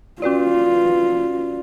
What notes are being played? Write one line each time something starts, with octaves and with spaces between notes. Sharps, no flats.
C#4 F4 F#4 B4 D5